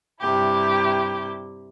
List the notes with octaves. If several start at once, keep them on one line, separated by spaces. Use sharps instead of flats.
G2 C3 E4 G4